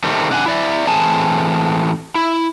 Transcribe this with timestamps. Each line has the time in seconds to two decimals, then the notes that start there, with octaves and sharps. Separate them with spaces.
0.04 D#3 G3 A3 C4
0.30 C3 D4 F#5 G#5
0.46 E4 D5 E5
0.87 A2 E3 C4 G#4 G#5 A5
2.15 E4